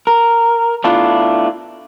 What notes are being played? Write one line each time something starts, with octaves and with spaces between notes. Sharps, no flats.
A#4
A3 B3 D4 E4 F4